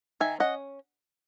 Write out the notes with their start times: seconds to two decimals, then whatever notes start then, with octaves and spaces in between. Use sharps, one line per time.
0.20 D#3 E5 G#5
0.40 C#4 D#5 F#5